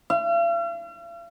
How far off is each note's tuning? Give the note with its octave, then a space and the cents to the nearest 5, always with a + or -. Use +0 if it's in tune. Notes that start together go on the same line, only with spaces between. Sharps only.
F5 -45